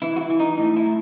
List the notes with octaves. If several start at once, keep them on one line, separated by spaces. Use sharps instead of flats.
E3 E4
F#4
E4
E3
D#4
A2 D#4
E4
A2